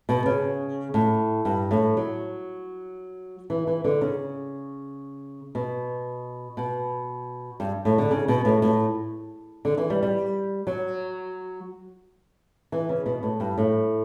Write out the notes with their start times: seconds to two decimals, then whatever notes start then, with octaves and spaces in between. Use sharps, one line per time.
0.09 B2
0.26 C#3
0.94 A2
1.45 G2
1.71 A2
1.97 F#3
3.50 E3
3.67 E3
3.84 D3
4.01 C#3
5.55 B2
6.57 B2
7.60 G2
7.85 A2
7.98 D3
8.11 C#3
8.28 B2
8.45 A2
8.62 A2
9.65 D3
9.78 E3
9.90 G3
10.03 G3
10.67 F#3
12.72 E3
12.89 C#3
13.06 B2
13.23 A2
13.40 G2
13.58 A2